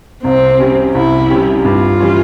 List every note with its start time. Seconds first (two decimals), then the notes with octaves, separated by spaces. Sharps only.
0.24 C2 C4
0.59 C3 G3 C#4 G4
0.95 C2 E4
1.30 C3 G3 C#4 G4
1.65 G2 F4
2.00 E3 G3 C#4